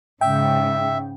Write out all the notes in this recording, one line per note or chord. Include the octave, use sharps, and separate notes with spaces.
G#2 C#3 E5 G5